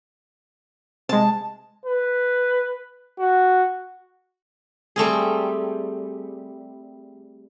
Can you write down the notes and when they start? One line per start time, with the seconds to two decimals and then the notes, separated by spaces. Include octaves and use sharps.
1.09 C3 G#3 A5
1.86 B4
3.19 F#4
4.96 G3 A3 C4 G#4